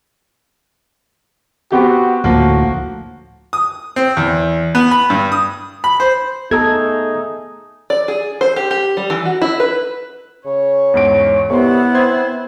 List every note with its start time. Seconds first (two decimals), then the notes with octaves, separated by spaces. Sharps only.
1.72 B3 C4 F#4 G4
2.24 D2 A2 F3 A#3 F#4
3.53 D#6
3.96 C4
4.17 E2
4.75 B3
4.91 B5
5.10 G2
5.32 D#6
5.84 B5
6.00 C5
6.51 A3 B3 D#4 G#4 A4 A#5 E6 G#6
7.90 D5
8.08 G#4
8.41 C5
8.56 G4
8.71 G4
8.97 G3
9.10 E3
9.25 F#4
9.42 E4
9.60 B4
10.46 C#3 C#5
10.94 E2 G#2 D7
11.50 C2 B3 E4 C6 C#6
11.95 C4 C6 G#6